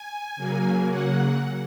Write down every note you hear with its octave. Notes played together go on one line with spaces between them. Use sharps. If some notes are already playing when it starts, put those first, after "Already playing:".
Already playing: G#5
C#3 F#3 A#3
F#5